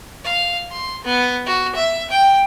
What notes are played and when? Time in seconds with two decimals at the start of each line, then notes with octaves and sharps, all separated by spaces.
0.24 F5
0.71 C6
1.04 B3
1.46 F#4
1.75 E5
2.10 G5